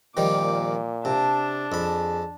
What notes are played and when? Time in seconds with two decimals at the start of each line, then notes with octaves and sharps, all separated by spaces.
0.17 A#2 D#3 F3 G3 D6
1.05 C3 D4 A5
1.72 F2 G#4 B5